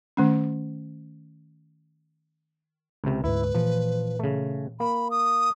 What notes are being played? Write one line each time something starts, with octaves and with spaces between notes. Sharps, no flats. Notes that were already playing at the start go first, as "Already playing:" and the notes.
D#3 A3 C#4
C#2 C3
D2 G#2 E4 B4
A#2 E3 F3
C#3 A3
A#3 B5
D#6